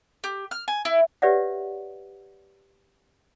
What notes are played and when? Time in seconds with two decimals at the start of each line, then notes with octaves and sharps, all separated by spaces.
0.24 G4
0.51 F6
0.68 G#5
0.85 E4
1.22 G4 B4 C#5 D5 E5 F#5